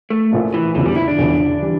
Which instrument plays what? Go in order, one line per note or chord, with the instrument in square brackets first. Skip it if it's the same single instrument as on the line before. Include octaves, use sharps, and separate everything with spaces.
[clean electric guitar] A3
[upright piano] A#1 A#2 F3 A3 E4
[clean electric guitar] E3
[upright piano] E1 E2 D3 F3 [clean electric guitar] E3
[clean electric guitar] G3
E4
D4
[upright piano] E1 E2 D3 F3
E3 G3